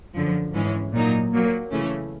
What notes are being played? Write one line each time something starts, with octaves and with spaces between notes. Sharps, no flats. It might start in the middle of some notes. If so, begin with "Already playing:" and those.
F#2 D3 F3
G#2 E3 G#3 C#4
A#2 F#3 A#3 D#4
A#2 F#3 A#3
C#3 E3 A3 C#4